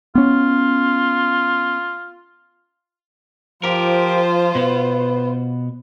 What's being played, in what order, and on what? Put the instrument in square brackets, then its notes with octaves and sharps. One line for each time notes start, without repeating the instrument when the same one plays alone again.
[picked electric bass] B3 C#4 [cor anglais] F4
[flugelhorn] F3 [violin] F4 C5 [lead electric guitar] G4 A#4
[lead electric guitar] B2 B3 [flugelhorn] B4